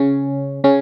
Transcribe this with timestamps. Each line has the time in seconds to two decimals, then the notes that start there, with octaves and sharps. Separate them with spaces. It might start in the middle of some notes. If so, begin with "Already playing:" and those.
Already playing: C#3 C#4
0.64 C#3 C#4